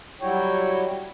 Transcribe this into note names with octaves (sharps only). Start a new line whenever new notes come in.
F#3 G3 E4 F#4 C#5 G5